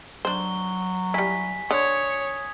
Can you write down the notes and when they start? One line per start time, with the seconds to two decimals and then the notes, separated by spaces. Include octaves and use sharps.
0.25 F#3 D4 C5 G7
1.14 G3 E4 G#5 B6
1.71 D3 C#5 D#6 G#6